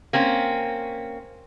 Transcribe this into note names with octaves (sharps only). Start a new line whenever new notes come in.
A#3 C4 C#4